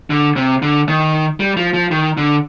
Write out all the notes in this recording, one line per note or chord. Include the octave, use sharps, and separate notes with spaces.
D3
C3
D3
D#3
G3
F3
F3
D#3
D3